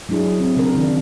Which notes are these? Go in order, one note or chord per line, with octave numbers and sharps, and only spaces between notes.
F#3 G#3 D4 E4 G#4
C4
C#3 D4 E4 A#4
D#3 E3 D4